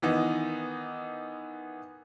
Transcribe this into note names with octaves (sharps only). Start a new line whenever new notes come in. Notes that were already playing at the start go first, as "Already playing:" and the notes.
D#3 E3 B3 D#4